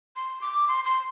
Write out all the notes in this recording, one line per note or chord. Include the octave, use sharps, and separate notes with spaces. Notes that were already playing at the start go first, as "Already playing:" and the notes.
C6
D6
C6
C6